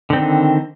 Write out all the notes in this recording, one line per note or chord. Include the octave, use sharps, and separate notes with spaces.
D3 D#3 C4